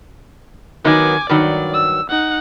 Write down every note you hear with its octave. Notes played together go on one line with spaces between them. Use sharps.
D#3 F#3 B3 G#5 D6
G2 D#3 F#3 D5
E6
D#4 F#5